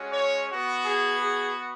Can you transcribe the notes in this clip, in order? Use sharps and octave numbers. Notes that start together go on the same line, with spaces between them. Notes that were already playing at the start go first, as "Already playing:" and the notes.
Already playing: G#3 C#4 F#4
C#5
B3 F#4
G#4
G#4